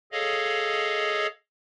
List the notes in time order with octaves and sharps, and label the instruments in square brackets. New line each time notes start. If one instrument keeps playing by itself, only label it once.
[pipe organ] G#4 A4 C#5 D#5 F5